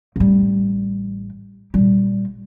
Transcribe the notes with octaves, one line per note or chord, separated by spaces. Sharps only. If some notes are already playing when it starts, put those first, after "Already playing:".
A1 G3
A#2 G3